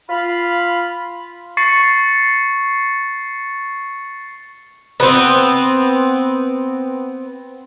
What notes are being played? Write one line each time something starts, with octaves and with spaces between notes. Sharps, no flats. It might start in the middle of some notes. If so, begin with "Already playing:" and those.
F4 F5 B5
C#6 A6 C7 C#7
B3 C4